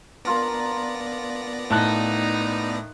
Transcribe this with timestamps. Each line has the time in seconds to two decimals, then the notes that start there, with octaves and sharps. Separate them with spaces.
0.25 B3 D4 F4 A#4 D5 A#6
1.70 A2 D#4 A5 F#6